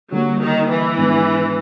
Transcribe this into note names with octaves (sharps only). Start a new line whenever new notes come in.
D3 F#3 G3 A#3
D#3
E3
G#2 D#3 G#3 B3 D4